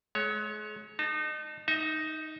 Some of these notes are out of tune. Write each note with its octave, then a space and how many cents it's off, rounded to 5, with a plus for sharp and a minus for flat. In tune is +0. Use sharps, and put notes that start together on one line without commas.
G#3 +35 C#5 +0
D#4 -30 A5 +10
D#4 +0 E5 -40